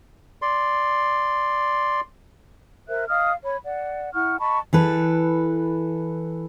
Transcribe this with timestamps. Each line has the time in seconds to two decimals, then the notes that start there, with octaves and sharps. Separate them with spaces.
0.42 D5 C6
2.88 A#4 C5 E5 F#6
3.08 D#5 F5 D#6 F6
3.43 C#5 B5
3.64 D5 F#5
4.14 E4 F#5 C#6 F6
4.39 D#5 A5 B5 C#6
4.73 E3 A4 B4